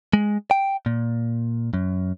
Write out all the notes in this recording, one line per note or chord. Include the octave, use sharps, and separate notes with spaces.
G#3
G5
A#2
F#2